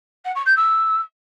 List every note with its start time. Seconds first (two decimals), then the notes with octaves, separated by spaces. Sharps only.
0.24 F#5
0.35 C#6
0.45 G6
0.56 E6